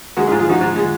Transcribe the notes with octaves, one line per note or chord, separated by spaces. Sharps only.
G#3 F#4 A#4
F4 G#4
G#2
F4 G#4
F3 D#4 F#4
G#2
G#3